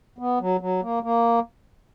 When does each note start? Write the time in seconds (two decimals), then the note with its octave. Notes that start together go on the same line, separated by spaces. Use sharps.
0.18 B3
0.41 F#3
0.61 F#3
0.82 A#3
1.03 A#3